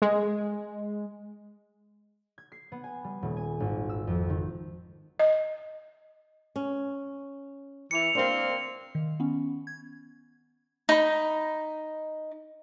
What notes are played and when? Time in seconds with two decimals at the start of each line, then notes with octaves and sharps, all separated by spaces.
0.02 G#3
2.38 G#6
2.52 C7
2.72 B3
2.84 G#5
3.04 G3
3.22 D#1
3.37 G#5
3.60 G#1
3.89 E6
4.07 F2
4.30 D#3
5.20 D#5
6.56 C#4
7.91 E3 C#7 F7
8.15 A#3 C4 D4 A#4
8.95 D#3
9.20 B3 C#4
9.67 G#6
10.89 D#4 B5